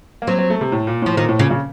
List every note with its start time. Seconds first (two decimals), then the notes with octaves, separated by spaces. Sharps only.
0.22 A#3
0.27 F#3 C4
0.39 C4
0.50 A3
0.61 C3
0.72 A2
0.87 A#2
1.02 A2 F3
1.17 A#2 D#3
1.29 A2
1.39 A#2 C#3
1.51 C#3